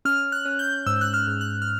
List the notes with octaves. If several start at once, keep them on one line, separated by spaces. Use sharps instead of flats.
C#4 F6
F#6
C#4
G6
G#2 E6
F#6
F6
G#2
F#6
F6